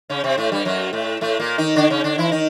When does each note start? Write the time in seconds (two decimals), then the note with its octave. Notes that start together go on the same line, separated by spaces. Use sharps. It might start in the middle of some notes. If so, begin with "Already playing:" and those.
0.10 C#3 C#4
0.24 C3 C4
0.38 A2 A3
0.52 G2 G3
0.65 F#2 F#3
0.93 A2 A3
1.21 A2 A3
1.40 A#2 A#3
1.58 D#3 D#4
1.76 D3 D4
1.90 C#3 C#4
2.04 D3 D4
2.18 E3 E4
2.31 D#3 D#4